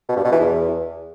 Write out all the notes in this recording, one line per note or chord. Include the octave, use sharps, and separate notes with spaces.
B2
G2
B2
E3
E2